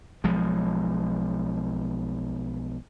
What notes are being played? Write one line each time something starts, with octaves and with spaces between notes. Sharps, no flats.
B1 F3 G#3